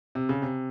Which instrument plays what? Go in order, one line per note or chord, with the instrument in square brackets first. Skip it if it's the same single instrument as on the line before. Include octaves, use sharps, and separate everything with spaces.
[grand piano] C3
C#3
C3